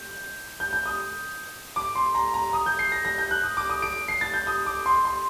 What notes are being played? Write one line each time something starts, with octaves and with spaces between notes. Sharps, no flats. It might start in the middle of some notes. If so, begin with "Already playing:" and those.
Already playing: G6
G6
G6
D#6
D6
C6
A#5
A#5
D#6
G6
C7
A#6
A#6
G6
F#6
D#6
D6
D#6
D7
C7
A6
G6
D#6
D6
C6
C6